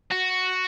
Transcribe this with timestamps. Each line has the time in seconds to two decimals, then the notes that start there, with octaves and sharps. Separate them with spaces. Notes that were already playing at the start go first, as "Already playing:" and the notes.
0.11 F#4